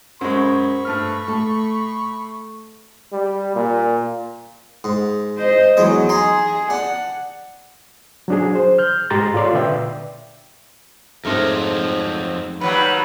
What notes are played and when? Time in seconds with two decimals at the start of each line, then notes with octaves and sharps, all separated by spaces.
0.21 F#2 G#3 C5 B5 C#6
0.85 G2 A3 F6
1.28 A3 A5
3.12 G3
3.56 A#2
4.84 G#2
5.38 C5 D#5
5.77 E2 F#3 G#3 D#5
6.09 D#4 G#4 A#5 C6
6.70 D4 F#5
8.28 F#3 D4 G#4
8.55 C5
8.78 F6 G6
9.10 G#2 G#3 G4 A#5 C6 A6
9.34 F4 A4 C#5 D5 F5 C6
9.53 A#2 D3 B4 D5 E5 G5
11.25 F2 G#2 F3 F#3 A3 A#4
12.61 D#2 F#3 G3 B4